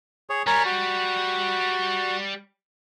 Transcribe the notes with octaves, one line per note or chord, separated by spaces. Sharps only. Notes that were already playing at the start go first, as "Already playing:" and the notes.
G#4 C#5
G3 A#4 C#5 G#5
F#4